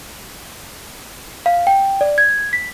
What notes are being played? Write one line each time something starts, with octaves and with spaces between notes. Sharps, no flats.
F5
G5
D5
G#6
B6